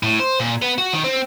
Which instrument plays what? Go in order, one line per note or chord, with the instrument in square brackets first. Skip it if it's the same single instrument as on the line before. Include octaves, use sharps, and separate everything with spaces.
[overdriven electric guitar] A2
C5
A#2
B3
F#4
D#3
C4